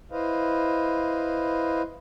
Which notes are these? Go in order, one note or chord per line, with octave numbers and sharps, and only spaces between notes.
E4 B4 C5 D#5 F5